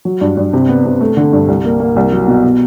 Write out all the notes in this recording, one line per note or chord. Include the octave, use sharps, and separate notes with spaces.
F#3
G2
G2
C3
B3
C3
A3
D3
G2
C2
A#3
A#3
C2
F#3
B2
B2